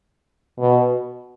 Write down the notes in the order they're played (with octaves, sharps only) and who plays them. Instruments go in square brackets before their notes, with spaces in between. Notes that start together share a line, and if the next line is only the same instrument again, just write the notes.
[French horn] B2